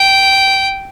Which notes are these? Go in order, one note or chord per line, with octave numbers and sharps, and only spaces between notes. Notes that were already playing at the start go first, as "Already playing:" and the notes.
Already playing: G5